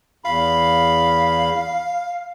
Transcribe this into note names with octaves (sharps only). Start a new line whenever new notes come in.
E2 F5 B5